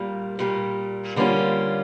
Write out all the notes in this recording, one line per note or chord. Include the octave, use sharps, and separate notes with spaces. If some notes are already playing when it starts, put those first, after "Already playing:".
Already playing: A#2 G3 A#3
A#2 G3 A#3
D3 G3 A#3 C#4 F4